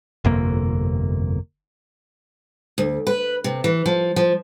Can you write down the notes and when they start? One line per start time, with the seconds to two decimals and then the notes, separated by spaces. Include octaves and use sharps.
0.25 G1 F2 C3 A#3
2.78 D2
3.07 B4
3.44 C3
3.64 E3
3.86 F3
4.16 F3